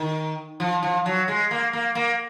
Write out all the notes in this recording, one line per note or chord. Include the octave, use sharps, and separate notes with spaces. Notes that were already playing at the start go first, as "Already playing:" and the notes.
Already playing: D#3
F3
F3
F#3
G#3
A#3
A#3
A#3